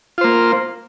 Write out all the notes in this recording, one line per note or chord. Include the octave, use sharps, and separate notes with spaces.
A#3 F4 C5